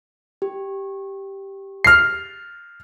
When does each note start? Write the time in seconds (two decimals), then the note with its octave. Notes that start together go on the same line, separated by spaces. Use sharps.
0.42 G4
1.84 F6 C7